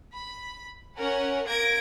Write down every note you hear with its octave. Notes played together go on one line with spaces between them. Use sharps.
B5
C#4 A#4 F#5 G#5
A#3 G#6 A#6 D7